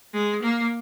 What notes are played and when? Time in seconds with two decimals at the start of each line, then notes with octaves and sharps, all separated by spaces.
0.13 G#3
0.43 A#3